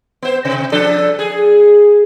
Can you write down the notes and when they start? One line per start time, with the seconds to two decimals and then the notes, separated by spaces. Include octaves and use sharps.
0.22 B3 C5
0.45 C3
0.72 F3 D4 A4
1.19 G#4